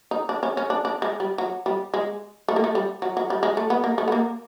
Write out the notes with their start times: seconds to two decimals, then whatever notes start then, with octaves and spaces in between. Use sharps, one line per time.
0.11 D#4
0.29 D4
0.43 C#4
0.57 C#4
0.70 D4
0.85 D4
1.02 G#3
1.20 G3
1.38 F#3
1.66 G3
1.94 G#3
2.48 A3
2.56 A#3
2.64 A3
2.75 G3
3.02 F#3
3.17 F#3
3.30 G3
3.43 G#3
3.57 A3
3.70 B3
3.84 A#3
3.98 A3
4.08 B3
4.12 A#3